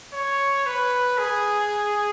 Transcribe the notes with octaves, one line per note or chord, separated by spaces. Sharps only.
C#5
B4
G#4